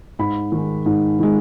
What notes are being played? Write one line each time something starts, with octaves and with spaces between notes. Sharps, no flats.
G#2 B5
D#3 G#3
G#2
D#3 G#3